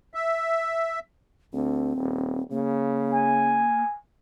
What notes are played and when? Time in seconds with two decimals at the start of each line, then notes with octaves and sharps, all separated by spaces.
0.14 E5
1.53 D2 C4
1.97 D#1
2.51 C#3 A#3
3.11 G#5